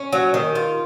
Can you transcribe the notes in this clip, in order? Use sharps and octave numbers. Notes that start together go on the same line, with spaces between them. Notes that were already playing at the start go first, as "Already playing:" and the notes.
Already playing: C#4
F#3
D#3
F4